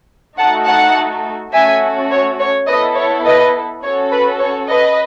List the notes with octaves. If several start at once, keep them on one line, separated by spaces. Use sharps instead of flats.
A3 D#4 F#4 A4 F#5 A5
F#5 A5
A3 C#4 F#4 A4 E5 G#5
C#5
C#5
B3 E4 A4 B4 D#5
C#5
B4 D#5
C#4 F#4 A4 C#5
B4
C#5
B4 D#5